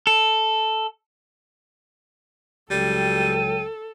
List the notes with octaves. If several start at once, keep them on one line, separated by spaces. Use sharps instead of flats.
A4
C#2 F#3 G3 A4 G5 D#7